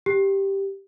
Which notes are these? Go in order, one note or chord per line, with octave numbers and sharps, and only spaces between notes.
G4